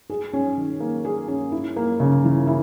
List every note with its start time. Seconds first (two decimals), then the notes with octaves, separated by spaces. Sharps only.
0.10 G#4
0.33 C#4
0.57 D#3
0.80 A#3
1.05 G#4
1.28 C#4
1.52 E4
1.76 A#3
2.00 C#3
2.24 E3
2.47 E4